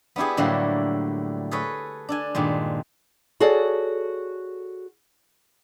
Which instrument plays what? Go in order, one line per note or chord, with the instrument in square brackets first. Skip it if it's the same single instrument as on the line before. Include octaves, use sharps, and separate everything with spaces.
[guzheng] B3 D4 E4 G4 G#4
A2 D3 F#3 G3 A3 A#3
G#4 A4 B4 C#5
D4 A4 G#5
G2 A#2 D#3 G#3
[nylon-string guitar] F#4 G#4 A4 C#5 D5 F#5